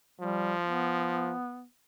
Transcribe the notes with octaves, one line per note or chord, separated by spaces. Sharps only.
F3 G3
B3